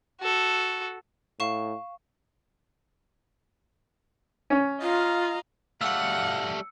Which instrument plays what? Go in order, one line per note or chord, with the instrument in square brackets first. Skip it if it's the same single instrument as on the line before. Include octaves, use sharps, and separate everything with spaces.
[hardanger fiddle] F#4 A4
[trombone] A2 [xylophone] F5 C#6 E7
[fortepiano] C#4
[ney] F4 [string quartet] D#5 F5 A#5
[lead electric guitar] G3 A3 [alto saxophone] F5 [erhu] F#5 [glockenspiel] E6 C#7